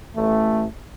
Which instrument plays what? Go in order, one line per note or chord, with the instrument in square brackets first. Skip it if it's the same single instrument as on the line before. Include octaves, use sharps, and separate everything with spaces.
[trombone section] A1 A3